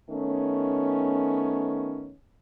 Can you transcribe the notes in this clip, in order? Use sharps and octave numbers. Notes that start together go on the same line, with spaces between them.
D#3 A3 B3 C#4